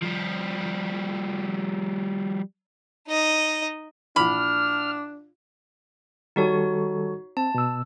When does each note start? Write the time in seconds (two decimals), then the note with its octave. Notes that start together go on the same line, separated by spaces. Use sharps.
0.02 F3 G3
3.08 D#4 D#5
4.16 A#1 E3 D4 B5 F6
6.36 D#3 G3 D#4 F#4 A4 C#5
7.37 C4 A5
7.54 B2 E6